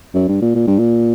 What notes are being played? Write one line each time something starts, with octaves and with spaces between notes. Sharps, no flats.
F#2
G2
A#2
A#2
G2
A#2